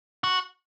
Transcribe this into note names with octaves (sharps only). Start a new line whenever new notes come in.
F#4